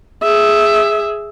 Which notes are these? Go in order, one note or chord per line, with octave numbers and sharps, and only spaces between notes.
G#4 E5